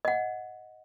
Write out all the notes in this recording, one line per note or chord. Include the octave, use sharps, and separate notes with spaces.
D#5 F#5